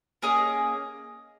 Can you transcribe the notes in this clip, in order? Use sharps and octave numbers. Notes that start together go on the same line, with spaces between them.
A#3 C#4 G#4 D#5